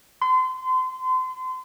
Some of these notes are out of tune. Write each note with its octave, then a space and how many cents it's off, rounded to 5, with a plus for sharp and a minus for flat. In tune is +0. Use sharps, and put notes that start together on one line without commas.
C6 -35